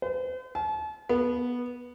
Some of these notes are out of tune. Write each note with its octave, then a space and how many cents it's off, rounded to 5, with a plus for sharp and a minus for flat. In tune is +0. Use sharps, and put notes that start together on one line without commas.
C5 -45
A5 -40
B3 -10